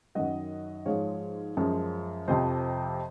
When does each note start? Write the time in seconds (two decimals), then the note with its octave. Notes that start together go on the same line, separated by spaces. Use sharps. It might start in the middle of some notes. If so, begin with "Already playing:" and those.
0.15 F#2 D#3 F#3 D#5 F#5
0.86 G#2 F3 G#3 C#5 F5
1.57 F#2 F3 G#3
2.28 F2 C3 F3 C5 D#5